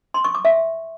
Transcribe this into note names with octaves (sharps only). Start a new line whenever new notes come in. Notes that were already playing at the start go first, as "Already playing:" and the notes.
C6
C#6
D6
E5